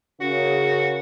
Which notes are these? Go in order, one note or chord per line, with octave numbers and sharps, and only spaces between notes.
C#3 C#4 F#4 A#4